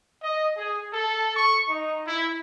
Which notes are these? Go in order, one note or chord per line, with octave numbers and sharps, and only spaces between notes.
D#5
G#4
A4
C#6
D#4
E4